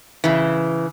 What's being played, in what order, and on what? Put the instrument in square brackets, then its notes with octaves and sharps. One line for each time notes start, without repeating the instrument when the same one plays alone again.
[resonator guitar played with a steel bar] C#3 E3